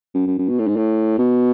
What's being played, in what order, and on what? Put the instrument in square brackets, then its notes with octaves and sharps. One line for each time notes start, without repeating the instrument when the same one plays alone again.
[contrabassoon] F#2
F#2
F#2
B2
A2
G#2
A2
B2